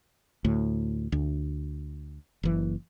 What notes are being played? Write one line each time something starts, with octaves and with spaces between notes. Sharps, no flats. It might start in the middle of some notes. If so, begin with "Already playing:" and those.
D2 A2
D2
F#1 E3